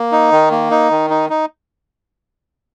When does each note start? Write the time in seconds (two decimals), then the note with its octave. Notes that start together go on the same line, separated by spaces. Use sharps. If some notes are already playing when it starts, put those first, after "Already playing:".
Already playing: A#3
0.12 D#4
0.32 D#3
0.51 A#3
0.71 D#4
0.91 D#3
1.10 D#4
1.30 D#4